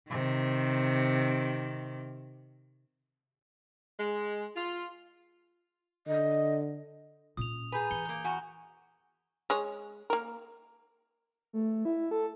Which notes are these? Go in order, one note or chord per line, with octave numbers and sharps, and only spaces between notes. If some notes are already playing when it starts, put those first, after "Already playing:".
C3 D#3
G#3
F4
D3 D#5
A#2 C#4 D#6 F7
G#4 B4 G#5 A#5 G6
E3 C#7 G7
G#3 A#3
E2 F#4 G#5
G#3 G#4 C#5
A#3 A#4
A3
E4
A4